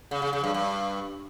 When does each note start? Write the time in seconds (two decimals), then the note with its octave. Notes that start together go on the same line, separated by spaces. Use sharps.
0.11 C#3
0.22 C#3
0.33 C#3
0.44 G2
0.54 G2